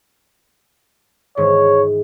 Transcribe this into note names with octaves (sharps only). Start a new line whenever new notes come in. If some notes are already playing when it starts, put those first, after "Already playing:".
G#2 D#3 E3 C#5